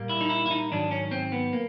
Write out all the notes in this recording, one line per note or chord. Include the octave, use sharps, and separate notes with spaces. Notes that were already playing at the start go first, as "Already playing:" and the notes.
Already playing: A#2 G3 A#3
E4
D#4
E4
E4
D#4
G#2 D#3 F#3 D4
C#4
C4
B3
A#3